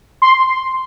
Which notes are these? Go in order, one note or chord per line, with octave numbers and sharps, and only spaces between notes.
C6